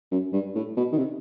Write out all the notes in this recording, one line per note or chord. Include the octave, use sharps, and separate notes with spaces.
F#2
G2
A2
B2
D#3
C3